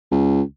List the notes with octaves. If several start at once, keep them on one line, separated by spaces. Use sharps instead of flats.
C#2